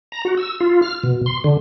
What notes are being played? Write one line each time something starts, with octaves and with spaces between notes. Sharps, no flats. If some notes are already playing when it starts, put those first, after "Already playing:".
A#5
F#4
E6
F4
F6
B2
C6
D3